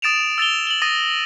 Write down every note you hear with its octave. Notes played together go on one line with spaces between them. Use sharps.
D#6 A6 D7 E7 F7
E6 A6 F7 G7
F#7 G7
D#6 A6 A#6 D#7